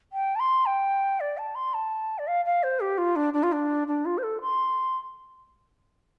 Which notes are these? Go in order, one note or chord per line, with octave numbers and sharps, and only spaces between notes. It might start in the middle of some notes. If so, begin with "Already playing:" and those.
G5
A5
C6
G5
D5
A5
C6
A5
D5
F5
F5
C5
G4
F4
D4
D4
F4
D4
D4
F4
C5
A4
C6